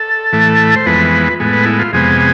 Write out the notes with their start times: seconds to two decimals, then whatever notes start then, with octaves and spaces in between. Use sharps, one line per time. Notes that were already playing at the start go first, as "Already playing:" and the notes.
Already playing: A4
0.33 A2 E3 A3
0.76 C5
0.86 F2 E3 G#3 B3 B4
1.40 A2 G#3 B3
1.53 B4
1.66 E4
1.79 F4
1.93 F2 C3 G#3 B3 G#4